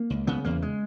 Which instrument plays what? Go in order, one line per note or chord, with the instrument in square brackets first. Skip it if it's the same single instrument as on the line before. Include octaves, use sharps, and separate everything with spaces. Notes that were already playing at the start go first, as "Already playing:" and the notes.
Already playing: [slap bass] A#3
C#2
C#3 B3
E2 A#3
G#3